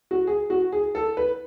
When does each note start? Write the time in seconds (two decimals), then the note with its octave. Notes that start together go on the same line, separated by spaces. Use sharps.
0.11 F#4
0.27 G#4
0.50 F#4
0.72 G#4
0.95 A4
1.17 B4